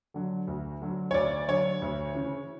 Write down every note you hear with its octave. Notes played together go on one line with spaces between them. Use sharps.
D3 F#3
D2
D3 F#3
C#5
D2 D5
D3 F#3 C#5
D2
C#3 E3